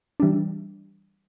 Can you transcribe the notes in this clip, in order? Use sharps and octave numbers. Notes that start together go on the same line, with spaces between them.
E3 G3 D4